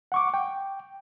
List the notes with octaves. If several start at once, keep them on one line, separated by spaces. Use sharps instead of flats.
F#5 C#6 D6
G5